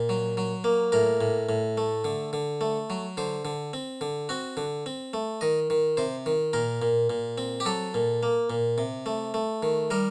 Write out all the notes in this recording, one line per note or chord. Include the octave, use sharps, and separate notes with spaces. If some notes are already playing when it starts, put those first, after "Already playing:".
Already playing: A#2
F#3
F#3
A#3
A2 A#4
A2
A2
A3
D3
D3
A3
F#3
D3 C5
D3
C4
D3
C4 F#4
D3
C4
A3
D#3 D#5
D#3
C3 C5
D#3
A#2 A#4
A#2
A#2
C4
G4
F#3 A4
A#2
A#3
A#2
C3
A3
A3
D#3
G3 A#4